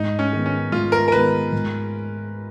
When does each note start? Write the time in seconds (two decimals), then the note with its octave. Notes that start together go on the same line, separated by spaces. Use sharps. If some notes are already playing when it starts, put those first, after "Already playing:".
Already playing: G#2 D#4
0.19 C#4
0.33 D#3 G#3 B3
0.46 C#4
0.72 G#2 F4
0.92 A#4
1.08 A#4
1.12 D#3 G#3 B3 B4
1.52 G#2